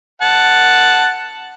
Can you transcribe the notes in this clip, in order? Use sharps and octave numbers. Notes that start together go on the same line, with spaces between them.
F#5 A5